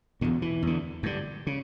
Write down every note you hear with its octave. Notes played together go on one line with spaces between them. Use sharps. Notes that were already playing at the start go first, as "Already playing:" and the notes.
E2 B2 D3
E3
E2 D3
G2 D3
C#3